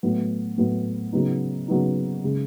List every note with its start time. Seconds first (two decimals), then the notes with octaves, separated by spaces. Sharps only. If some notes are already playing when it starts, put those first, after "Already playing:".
0.03 A2 F#3 B3
0.58 A2 F#3 B3
1.13 C#3 F#3 B3 D#4
1.68 C#3 F#3 B3 D#4
2.24 C#3 G#3